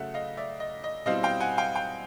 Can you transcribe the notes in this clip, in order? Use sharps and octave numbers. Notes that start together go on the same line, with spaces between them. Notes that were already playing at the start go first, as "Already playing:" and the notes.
Already playing: C#3 F#3 A3 E5 F#5
D#5 F5
D5 E5
D#5
D#5
B2 G3 C4 E4 D#5 F5
F5 G5
F#5 G#5
F5 G5
F5 G5